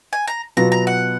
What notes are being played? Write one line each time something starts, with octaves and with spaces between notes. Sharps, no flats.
G#5
A#5
B2 F#3 B3 F4 A#5
A#5
F#5